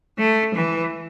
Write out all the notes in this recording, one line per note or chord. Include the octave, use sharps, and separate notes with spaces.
A3
E3